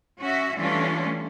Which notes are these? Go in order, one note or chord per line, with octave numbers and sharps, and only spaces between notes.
C#4 F#4 E5
E3 G3 A3 C#4 D4 F4